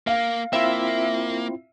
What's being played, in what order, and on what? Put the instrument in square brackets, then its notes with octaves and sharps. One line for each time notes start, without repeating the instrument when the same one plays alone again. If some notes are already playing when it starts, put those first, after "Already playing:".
[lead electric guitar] A#3 [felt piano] F5
[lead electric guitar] A#3 [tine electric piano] C4 E4 F4 [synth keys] E5